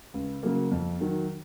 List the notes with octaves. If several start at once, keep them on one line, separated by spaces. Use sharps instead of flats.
C#2
C#3 F#3 A#3
F2
D#3 F#3